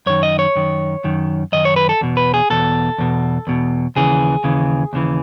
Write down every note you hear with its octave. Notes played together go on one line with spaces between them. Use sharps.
F#2 D#3 C#5
D#5
C#5
F#2 D#3
F#2 D#3
F#2 D#3 D#5
C#5
B4
A4
E2 B2
B4
G#4
E2 B2 A4
E2 B2
E2 B2
D#2 C#3 E3 G#4
D#2 C#3 E3
D#2 C#3 E3